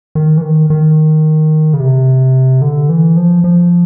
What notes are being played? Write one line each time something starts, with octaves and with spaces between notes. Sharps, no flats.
D#3
E3
D#3
D#3
C#3
C3
D3
E3
F3
F3